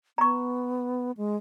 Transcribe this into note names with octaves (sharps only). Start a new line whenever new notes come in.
B3 A#5 C#6
G#3